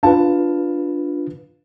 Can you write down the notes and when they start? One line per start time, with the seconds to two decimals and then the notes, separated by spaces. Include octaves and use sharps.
0.03 D4 F4 B4 F5 A5